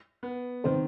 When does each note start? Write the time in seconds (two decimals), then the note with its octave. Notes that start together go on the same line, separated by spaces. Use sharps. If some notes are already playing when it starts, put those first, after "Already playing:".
0.23 B3
0.64 D#3 C4 C5